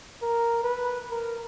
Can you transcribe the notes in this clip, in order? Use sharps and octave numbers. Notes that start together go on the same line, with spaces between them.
A#4
B4
A#4